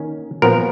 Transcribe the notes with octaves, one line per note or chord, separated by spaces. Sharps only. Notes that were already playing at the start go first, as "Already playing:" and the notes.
Already playing: D#3 A#3 C#4
A#2 F3 B3 A#4